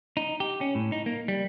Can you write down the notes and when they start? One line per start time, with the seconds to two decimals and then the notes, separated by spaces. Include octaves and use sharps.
0.17 D#4
0.40 G4
0.61 C#4
0.75 A2
0.92 D#4
1.06 A#3
1.28 G3